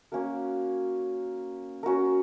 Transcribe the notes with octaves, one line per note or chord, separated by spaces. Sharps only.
A#3 C#4 F#4 A#4
C#4 F#4 A#4